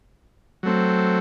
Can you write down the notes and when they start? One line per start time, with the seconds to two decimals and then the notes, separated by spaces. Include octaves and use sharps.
0.63 F#3 A3 C4